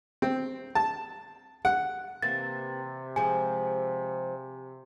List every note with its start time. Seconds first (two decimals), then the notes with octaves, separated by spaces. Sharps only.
0.22 C4
0.75 A5
1.65 F#5
2.22 C3 E3 A#3 C4 A6
3.16 F3 G#3 G#5